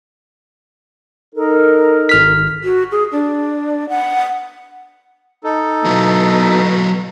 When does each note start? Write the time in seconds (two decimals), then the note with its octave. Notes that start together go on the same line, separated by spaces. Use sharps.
1.35 D#4 A4 A#4
2.09 G#1 F6 B6
2.64 F#4
2.91 G#4
3.12 D4
3.89 F#5
5.44 D#4 A4
5.85 B2 F#3 E4